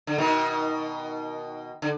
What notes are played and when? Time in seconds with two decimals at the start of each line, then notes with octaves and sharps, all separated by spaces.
0.07 D3
0.18 B2 D#3
1.82 D3